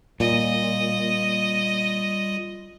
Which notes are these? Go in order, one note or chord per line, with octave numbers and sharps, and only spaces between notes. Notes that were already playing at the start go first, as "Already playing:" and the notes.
A#2 G3 F4 D#5